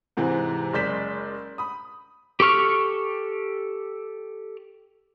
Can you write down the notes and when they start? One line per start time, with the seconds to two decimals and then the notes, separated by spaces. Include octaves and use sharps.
0.17 G#2 C3 E3 G#3
0.73 F#1 G#3 D5 G6 B6 E7
1.58 B5 D#6
2.40 G4 A4 C#6 F6